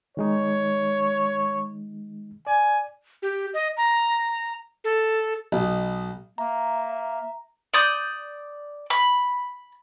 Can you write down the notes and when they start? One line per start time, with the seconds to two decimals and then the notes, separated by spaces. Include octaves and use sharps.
0.17 D#3 G#3 D#4 C#5
2.47 D5 G#5
3.22 G4
3.54 D#5
3.77 A#5
4.84 A4
5.52 B1
6.38 A#3 E5 A#5
7.74 D5 D#6 G6
8.90 B5